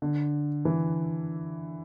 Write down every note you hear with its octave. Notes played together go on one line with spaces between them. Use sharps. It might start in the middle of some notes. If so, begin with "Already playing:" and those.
D3
E3